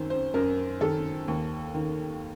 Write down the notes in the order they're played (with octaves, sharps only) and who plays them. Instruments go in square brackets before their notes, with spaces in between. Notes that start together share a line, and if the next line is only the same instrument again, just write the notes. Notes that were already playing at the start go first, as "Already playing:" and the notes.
Already playing: [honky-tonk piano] F#2 D#3 C5
C5
F#2 A#4
D#3 A4
D#2
D#3